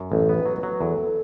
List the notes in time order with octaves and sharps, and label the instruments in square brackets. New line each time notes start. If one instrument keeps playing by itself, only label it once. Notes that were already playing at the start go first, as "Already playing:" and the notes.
Already playing: [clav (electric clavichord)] F#2
[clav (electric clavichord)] A1 [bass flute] A4
[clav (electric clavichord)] B3
[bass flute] B4
[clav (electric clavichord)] F#3
[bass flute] B4
[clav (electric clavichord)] F#3
[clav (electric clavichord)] E2 [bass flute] A4